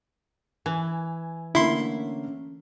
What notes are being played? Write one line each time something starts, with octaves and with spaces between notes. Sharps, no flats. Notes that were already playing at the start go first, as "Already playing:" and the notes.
E3 G#5
D3 A3 A#3 C#4 E4 C6